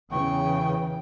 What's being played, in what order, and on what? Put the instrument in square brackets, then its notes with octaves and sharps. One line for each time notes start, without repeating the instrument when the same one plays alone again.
[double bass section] E2 C#3 E3 [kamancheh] G5 [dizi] C#6